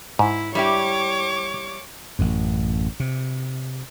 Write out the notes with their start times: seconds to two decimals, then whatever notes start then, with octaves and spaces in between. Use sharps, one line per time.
0.19 G#2 E4
0.55 G3 E4 G4 C#5 D6
2.19 A1 F#2
3.00 C3